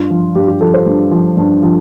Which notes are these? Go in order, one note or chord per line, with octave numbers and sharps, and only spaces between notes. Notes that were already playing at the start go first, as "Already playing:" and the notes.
Already playing: G2 F4
F3
G2 G4
G4
F3 A4
C5
G2
F3
G2
F3